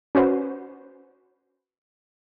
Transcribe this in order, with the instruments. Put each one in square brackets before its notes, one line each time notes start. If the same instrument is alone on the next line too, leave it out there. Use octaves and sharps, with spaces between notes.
[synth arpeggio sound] C#4 F#4 B4 C5